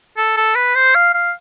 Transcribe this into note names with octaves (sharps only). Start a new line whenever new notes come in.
A4
A4
B4
C5
F5
F5